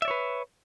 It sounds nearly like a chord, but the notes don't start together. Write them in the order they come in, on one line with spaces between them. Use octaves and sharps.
E5 D5 C#5 B4